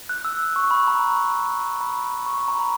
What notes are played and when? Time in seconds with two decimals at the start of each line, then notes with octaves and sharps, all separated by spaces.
0.09 F#6
0.25 E6
0.56 C#6
0.71 B5
0.87 A#5
1.81 B5
2.26 C#6
2.38 B5
2.48 A#5
2.59 B5